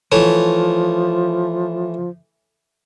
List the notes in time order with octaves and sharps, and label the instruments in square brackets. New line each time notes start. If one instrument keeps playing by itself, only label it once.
[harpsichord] E3 A3 C#5 [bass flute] F3